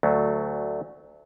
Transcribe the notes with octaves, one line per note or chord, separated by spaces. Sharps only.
D2 F#3 A3